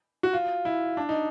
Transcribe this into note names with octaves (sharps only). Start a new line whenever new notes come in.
F#4
F4
E4
D4
D#4